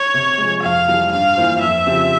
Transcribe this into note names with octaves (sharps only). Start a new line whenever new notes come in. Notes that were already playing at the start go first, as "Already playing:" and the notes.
Already playing: C#5
C3
F3 G#3
F2 F5
E3 G3
G2 F5
E3 A#3 F4 C5
F2 E5
C#3 F3 C4 G4